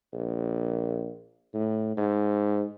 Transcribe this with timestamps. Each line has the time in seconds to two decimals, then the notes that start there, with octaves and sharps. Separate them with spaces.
0.13 A#1
1.54 A2
1.97 G#2